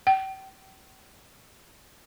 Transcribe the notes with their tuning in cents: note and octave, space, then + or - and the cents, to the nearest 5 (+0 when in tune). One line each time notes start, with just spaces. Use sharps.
G5 -40